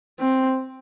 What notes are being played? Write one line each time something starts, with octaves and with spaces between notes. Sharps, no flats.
C4